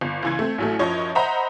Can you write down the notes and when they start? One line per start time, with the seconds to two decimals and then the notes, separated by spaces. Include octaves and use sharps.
0.01 G1
0.23 C#2 E3 G#6
0.39 A3 C4
0.58 A1 F#3 A3
0.79 F#2 F3 C#5 D#5
1.15 C5 D#5 E5 F#5 A#5 B5